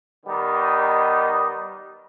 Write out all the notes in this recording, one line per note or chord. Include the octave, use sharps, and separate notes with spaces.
D#3 G3 B3 D#4